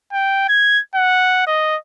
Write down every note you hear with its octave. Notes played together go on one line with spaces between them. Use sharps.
G5
G#6
F#5
D#5